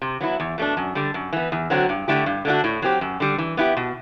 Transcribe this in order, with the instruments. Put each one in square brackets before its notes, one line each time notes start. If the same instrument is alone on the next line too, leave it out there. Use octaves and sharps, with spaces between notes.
[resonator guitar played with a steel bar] C3
F#3 B3 E4
E2
B2 A3 D4
F#2
D3 G3
F#2
E3 B3
E2
D3 F#3 C4 F#4
G2
D3 A3 E4 G4
G2
D3 A3 D4 F#4
A2
F#3 C4 G4
F#2
D3 G3
E3
B3 E4 G4
B2